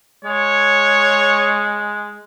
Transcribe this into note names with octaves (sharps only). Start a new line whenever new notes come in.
G#3 C#5